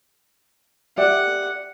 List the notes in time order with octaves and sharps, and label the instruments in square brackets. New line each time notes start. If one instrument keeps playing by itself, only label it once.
[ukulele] G4 D5 E5 [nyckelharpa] F#5